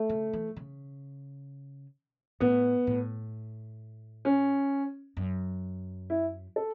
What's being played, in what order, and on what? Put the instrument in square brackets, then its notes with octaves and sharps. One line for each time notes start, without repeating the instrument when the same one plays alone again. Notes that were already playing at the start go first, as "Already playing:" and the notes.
Already playing: [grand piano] A3
[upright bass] C#3
E3
C#3
[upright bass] A2 [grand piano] B3
[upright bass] A2
[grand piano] C#4
[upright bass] F#2
[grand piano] E4
A4